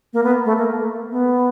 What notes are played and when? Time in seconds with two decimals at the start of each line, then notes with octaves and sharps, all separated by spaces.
0.13 A#3
0.24 B3
0.45 A3
0.57 A#3
1.11 B3